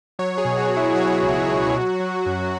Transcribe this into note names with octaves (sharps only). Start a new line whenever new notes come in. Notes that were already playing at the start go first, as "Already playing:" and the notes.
F#3 C#5
G#4
B2
F#4
F#3
E4
F#3 F#4
C#2
B2
F#3
F#3
F#2